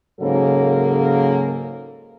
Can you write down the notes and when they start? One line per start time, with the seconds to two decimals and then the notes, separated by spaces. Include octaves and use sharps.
0.21 G#2 C#3 F#3 A#3 A4 A#4